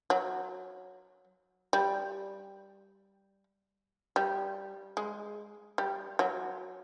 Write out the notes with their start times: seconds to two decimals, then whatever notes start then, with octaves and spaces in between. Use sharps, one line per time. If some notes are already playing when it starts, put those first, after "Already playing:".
0.10 F#3
1.73 G3
4.16 G3
4.97 G#3
5.78 G3
6.19 F#3